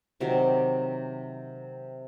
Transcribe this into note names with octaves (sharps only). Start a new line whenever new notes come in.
C3 D#3 F#3 G4